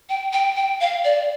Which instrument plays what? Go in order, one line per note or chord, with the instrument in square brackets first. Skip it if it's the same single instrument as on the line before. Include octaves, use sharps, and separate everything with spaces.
[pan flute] G5
G5
G5
F5
D5